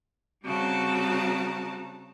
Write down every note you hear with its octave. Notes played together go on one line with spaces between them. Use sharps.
C#3 G3 C4 F#4 A5 A#5